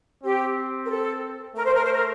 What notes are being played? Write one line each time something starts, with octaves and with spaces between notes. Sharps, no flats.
C4 G4
A#4
A4
A3 A#4
C5
A#4
C5
A#4